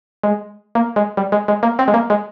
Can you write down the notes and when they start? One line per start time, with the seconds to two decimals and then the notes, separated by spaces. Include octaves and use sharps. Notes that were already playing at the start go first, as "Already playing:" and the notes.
0.23 G#3
0.75 A#3
0.96 G#3
1.17 G3
1.32 G#3
1.48 G#3
1.63 A#3
1.79 C4
1.88 G#3
1.94 A#3
2.10 G#3